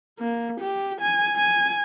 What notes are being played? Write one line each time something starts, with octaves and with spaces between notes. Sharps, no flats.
A#3
G4
G#5
G#5